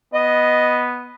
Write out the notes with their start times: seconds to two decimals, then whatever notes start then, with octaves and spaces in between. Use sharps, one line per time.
0.14 B3 D#5